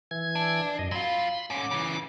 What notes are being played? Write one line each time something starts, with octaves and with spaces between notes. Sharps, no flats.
E3 G#6
D4
F#2 D#5
F#3 F4 B5 C6
G#2 C#4 D6
C#3 E3